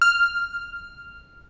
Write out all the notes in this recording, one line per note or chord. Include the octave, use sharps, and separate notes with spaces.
F6